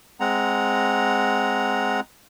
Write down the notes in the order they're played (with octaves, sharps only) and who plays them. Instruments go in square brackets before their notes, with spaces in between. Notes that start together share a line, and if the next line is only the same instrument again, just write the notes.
[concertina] G#3 C4 F#5 A#5